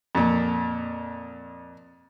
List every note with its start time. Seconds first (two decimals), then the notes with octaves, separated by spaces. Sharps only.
0.15 F2 A#2